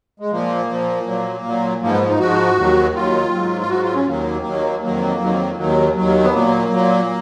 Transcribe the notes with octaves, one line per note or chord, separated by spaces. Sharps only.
G#3
A#2 F3 A#3
A#2 F3
A#2 F#3
A#2 F#3
G#2 F3 A#3
B3
D#4
G#2 F3 F#4
D#2 D#3 F#3
D#2 D#3 F#3 F4
G#2 F#3
F4
G#2 F#3 F#4
F4
C#4
D#2 D#3 F#3 A#3
D#2 D#3 F#3
F2 D#3 F#3 A#3
F2 D#3 F#3
D#2 D#3 F#3
D#2 D#3 F#3
B3
A#2 F#3 A#3
A#2 F#3